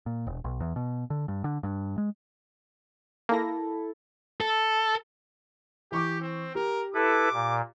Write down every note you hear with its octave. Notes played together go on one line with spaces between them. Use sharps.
A#2
E1
B1
E2
B2
D3
G2
D3
G2
G#3
A#3 E4 A4 A#6
A4
E3 G4 C#6 D6
C4
G4 A#4
E4 A4 B4 D6
A#2